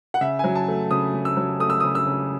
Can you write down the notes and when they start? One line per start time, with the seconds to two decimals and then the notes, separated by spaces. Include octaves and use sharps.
0.14 F#5
0.21 C#3 E5
0.39 F#3 G#5
0.55 A5
0.68 A3
0.91 C#3 D#6
1.14 C#3
1.25 E6
1.37 F#3
1.60 A3 D#6
1.70 E6
1.80 C#3 D#6
1.95 E6
2.06 C#3